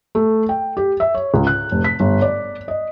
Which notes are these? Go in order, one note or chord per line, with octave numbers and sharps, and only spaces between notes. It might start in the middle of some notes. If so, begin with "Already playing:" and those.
A3
G5
G4
E5
C#5
C#2
F#6
F1
B6
G1
D5
D#5